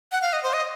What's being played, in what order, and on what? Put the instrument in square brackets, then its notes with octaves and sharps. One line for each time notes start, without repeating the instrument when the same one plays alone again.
[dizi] F#5
F5
D#5
C5
D#5